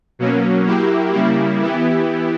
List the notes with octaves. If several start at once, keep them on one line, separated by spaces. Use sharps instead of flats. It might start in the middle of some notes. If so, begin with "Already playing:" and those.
B2 F#3 A#3 C#4
F#3 A#3 E4 G4
C#3 G3 A#3 E4
E3 B3 E4 G4